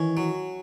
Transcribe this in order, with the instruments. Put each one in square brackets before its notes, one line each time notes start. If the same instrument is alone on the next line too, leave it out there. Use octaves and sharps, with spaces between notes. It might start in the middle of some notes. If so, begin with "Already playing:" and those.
Already playing: [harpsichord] D#3 C#4 [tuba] E3
[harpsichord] F#3